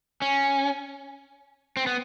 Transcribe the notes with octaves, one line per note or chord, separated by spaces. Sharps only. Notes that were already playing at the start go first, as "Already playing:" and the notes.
C#4
C4
B3